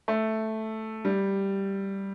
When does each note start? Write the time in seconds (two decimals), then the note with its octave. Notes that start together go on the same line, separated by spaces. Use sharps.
0.08 A3
1.05 G3